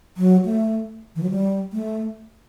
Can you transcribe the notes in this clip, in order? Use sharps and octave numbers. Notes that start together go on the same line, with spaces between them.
F#3
A3
E3
F#3
G3
A3